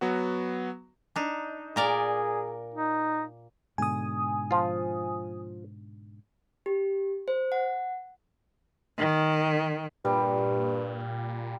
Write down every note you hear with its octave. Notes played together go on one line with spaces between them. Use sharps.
F#3 B3 F#4
D4 D#4
A#2 G#4 A#4 D5
D#4
G#2 B2 D3 G#5 D#6
F3 F4
G4
C5
F#5
D#3
G2 A#2 G3